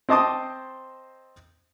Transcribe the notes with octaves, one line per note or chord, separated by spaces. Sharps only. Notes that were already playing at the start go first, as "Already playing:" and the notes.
C4 C5 D#5 A5 D6 D#6